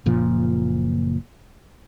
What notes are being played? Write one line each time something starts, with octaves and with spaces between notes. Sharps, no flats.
F#1 A#2 F3